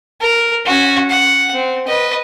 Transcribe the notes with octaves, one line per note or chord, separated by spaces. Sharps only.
A#4
C#4 F#4
F#5
C4
B4 D#5